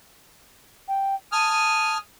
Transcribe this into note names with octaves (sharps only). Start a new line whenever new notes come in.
G5
G#5 A5 D#6 F6